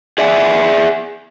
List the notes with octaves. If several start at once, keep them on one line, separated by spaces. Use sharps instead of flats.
G#4 D5 E5 F#5 G#5